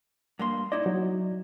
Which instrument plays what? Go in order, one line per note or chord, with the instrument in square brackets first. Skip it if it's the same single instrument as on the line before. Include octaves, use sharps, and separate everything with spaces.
[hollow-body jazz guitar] G2 A#3 C6
[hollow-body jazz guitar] D#4 E4 D#5 [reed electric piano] D5
[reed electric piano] F#3